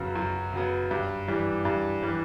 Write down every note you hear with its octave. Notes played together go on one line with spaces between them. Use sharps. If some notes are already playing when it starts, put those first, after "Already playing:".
Already playing: F#2 C#3 F#3 B3
F#2
C#3 F#3 B3
G2
E3 G3
G2
E3 G3